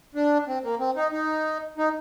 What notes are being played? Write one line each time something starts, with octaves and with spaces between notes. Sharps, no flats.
D4
C4
A#3
C4
D#4
D#4
D#4